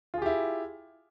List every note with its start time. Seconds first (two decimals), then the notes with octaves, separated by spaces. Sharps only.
0.14 F4
0.18 G#4
0.22 G4
0.26 E4